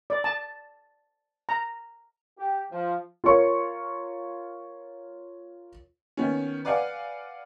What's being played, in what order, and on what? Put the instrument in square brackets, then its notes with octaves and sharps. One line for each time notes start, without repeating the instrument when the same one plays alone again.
[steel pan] D5
A5
A#5
[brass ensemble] G4
F3
[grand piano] F4 A#4 C#5 C#6
[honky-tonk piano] D#3 B3 C#4
B4 D5 F5 F#5 G#5 D6